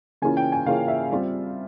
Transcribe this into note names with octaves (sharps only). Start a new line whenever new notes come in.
C#3 E3 A#3 C#4 F4 G#5
G5
G#5
C#3 E3 A#3 C#4 F4 F5
E5
G3 C4 F4